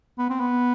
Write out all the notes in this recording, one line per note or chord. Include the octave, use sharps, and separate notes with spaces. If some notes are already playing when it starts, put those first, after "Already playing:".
B3
C4
B3